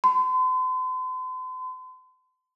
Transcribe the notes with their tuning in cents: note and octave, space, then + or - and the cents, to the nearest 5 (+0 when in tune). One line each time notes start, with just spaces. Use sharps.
C6 -45